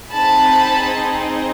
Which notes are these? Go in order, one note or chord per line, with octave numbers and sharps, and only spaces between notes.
C4 D#4 G#4 A5 B5